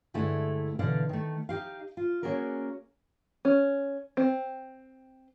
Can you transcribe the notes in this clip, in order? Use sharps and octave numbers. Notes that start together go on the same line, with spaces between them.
G2 D3 G#3 A3 E4
B2 D3 E3 D5 F5
D#3 A3
D#4 G4 F5
F4
A#3 C#4 F#4 G#4 A#4 D5
C#4
C4